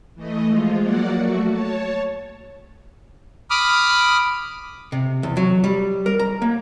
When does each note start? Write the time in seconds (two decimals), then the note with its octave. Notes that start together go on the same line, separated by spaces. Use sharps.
0.15 E3 A3 D#5
0.48 F3 G#3 F4
0.82 F#3 A#3 D5 F#5
1.17 A3 F#4
1.50 C#5 A5
3.50 B5 D6 D#6 F6
4.92 C3
5.23 E2
5.37 F#3
5.64 G3
6.06 A#4
6.20 A#5
6.42 A#3